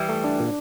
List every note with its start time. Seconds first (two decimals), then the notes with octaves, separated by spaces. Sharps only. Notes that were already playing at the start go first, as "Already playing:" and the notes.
Already playing: E3 G3
0.09 A3
0.24 D4
0.39 A#2